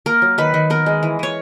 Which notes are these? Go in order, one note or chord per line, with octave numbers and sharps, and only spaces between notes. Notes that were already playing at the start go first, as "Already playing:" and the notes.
A#3 A#4
F#3
D#3 B4
D#3
B3 A#4
G#3
E3
E3 C#5